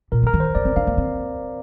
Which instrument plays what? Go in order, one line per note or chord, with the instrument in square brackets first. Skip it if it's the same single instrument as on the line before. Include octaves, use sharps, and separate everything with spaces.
[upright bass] A#2 [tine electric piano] A#4
[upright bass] D3 [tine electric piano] A#4
[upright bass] D#3
[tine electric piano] C5
[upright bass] A#3 [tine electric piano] D5
[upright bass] C4
[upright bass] D4 [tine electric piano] F5
[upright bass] A#3
C4